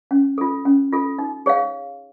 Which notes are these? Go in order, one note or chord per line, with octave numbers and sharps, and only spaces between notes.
C#4
F4 A4
C#4
F4 A4
D#4
G#4 C#5 F5